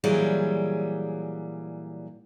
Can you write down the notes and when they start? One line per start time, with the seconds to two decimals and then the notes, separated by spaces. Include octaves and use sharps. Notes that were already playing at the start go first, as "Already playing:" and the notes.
0.04 A#2 E3 F#3 G3 G#4 C#5